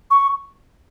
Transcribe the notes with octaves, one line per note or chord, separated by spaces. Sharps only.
C#6